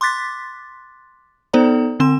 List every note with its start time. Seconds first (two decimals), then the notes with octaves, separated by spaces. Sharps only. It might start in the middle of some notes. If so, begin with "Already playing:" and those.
0.01 C6 D6 F#6 A6 B6
1.53 B3 D#4 A4 C5 D5 A#5
2.00 D3 C4 C6 E7